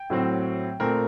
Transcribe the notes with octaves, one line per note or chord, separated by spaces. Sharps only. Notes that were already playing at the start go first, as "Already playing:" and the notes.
Already playing: G5
A2 F#3 C4
A#2 A3 C4 A#4